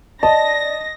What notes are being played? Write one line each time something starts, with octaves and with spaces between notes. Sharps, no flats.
D5 D#5 A5 A#6